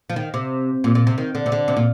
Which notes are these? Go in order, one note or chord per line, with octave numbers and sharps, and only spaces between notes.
F3
D#3
C3
A#2
A#2
C3
D#3
D3
C3
D3
C3
A#2